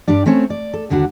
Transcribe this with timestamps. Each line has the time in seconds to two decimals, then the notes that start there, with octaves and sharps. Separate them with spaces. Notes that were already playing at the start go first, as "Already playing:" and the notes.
0.08 G2 G3 D4 D5
0.26 A3 C4 C#4 C#5
0.50 D5
0.73 A4
0.90 D#2 D3 G3 D4 F#4